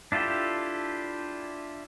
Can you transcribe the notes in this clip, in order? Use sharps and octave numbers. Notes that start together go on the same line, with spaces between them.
D4 E4 F4 G4 A4